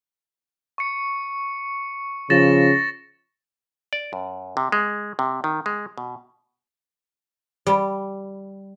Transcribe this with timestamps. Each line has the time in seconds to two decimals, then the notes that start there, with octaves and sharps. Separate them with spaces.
0.78 C#6 C#7
2.30 C#3 F3 A6 A#6 E7
3.93 D5
4.13 F#2
4.57 C3
4.72 G#3
5.19 C3
5.44 D#3
5.66 G#3
5.98 B2
7.67 G3